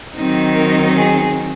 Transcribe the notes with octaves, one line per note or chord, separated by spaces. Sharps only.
D#3 F#3 C4 D#4
A#4
G#4